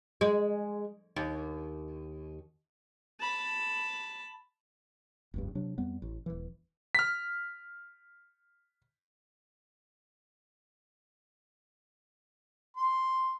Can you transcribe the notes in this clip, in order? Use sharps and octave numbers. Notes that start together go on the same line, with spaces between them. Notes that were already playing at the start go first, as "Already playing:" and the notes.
G#3
D#2
A5 B5
F1 C#2 G2
C3 F#3 D4
F2 G3 B3
A1
D#1 E3
F6 B6
C6